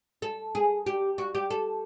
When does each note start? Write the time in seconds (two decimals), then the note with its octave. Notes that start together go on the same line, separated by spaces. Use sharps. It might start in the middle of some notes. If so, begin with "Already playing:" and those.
0.22 A4
0.55 G#4
0.86 G4
1.18 F#4
1.35 G4
1.51 A4